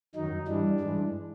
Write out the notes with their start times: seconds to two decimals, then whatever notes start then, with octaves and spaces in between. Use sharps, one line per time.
0.15 F#2 D#3 F#3 D#4
0.48 G2 E3 G3 D4
0.80 G2 E3 G#3